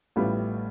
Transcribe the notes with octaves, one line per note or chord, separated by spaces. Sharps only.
A1 A2 G3 B3 F4